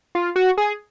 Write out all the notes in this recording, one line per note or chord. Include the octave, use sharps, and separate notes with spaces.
F4
F#4
G#4